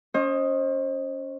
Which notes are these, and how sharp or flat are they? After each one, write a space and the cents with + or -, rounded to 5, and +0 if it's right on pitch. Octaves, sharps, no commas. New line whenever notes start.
C#4 +15 C5 +35 D#5 +0